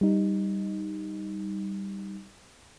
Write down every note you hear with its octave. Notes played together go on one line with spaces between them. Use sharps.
G3 D#4